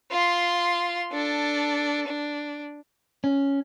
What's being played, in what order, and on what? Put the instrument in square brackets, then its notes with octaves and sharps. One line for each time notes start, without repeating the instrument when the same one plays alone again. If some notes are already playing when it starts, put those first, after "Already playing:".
[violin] F4 C6
D4 A4
D4
[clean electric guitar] C#4